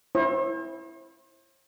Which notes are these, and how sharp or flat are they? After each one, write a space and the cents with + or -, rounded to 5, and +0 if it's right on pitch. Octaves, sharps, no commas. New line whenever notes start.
E4 +0 C5 +45